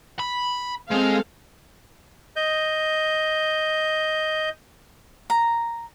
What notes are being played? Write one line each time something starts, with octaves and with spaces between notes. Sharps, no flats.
B5
G#3 C4 A4 F5
D#5 G6
A#5